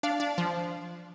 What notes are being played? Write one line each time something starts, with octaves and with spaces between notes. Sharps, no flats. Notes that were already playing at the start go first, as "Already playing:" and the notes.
D4 F5
D4
F3